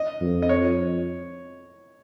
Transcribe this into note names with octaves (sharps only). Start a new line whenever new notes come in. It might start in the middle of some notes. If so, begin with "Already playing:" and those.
Already playing: D#5
F2
D#5
C#5